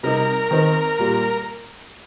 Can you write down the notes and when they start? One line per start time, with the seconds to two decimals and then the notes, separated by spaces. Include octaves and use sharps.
0.03 C3 G3 D#4 A#4
0.51 D#3 C4 D#4
0.99 A#2 G3